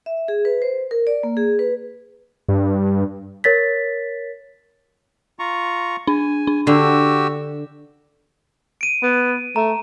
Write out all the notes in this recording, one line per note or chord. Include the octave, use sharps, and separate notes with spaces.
E5
G#4
B4
C5
A#4
D5
A#3
G#4
B4
G2
A#4 C#5 A6 B6
F4 A#5 C#6
D4 G#5
D4
D3 F#4 G4 E6
D7 D#7
B3
A3 A#5